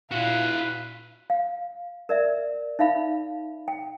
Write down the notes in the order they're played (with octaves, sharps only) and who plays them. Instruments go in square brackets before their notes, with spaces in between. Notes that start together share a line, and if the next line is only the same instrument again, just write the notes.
[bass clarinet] A#2 [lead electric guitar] E4 F#4 [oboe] B4 [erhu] F5
[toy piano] F5
A#4 D5 E5
D#4 E5 F5 B5
G5